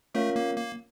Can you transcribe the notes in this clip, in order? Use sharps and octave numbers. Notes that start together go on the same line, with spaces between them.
A3 C#4 F4 A#4 C#5 F5
A#3
A#3